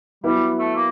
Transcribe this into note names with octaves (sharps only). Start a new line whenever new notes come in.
F#3 G3 B3 E4
A3
A#3